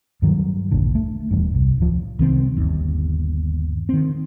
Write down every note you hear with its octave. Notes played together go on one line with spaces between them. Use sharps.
G2 D#3 E3 F#3
E1 A#1 A#2 D3
A3
D#1 E2 G2
C2
D1 F3
C2 D#3 C4
G1 D#2
D#3 C4